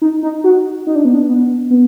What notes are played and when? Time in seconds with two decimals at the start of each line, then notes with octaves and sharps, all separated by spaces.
0.02 D#4
0.23 D#4
0.44 F#4
0.87 D#4
0.95 D4
1.05 B3
1.14 D4
1.29 B3
1.71 B3